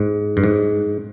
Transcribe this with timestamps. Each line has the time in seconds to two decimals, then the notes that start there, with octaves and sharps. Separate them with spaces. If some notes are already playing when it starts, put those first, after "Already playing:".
Already playing: G#2
0.37 G2
0.44 G#2